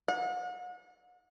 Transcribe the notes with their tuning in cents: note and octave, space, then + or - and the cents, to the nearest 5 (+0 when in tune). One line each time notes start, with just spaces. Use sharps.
F#5 -40